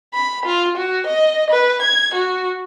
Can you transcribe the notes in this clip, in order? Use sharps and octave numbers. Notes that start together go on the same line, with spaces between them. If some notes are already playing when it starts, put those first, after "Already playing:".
B5
F4
F#4
D#5
B4
G#6
F#4